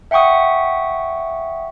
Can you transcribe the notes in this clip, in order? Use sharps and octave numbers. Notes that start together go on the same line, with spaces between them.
E5 F#5 G5 C#6 D#6